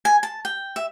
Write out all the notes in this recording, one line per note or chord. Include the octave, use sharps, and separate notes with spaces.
G#5
A5
G5
E5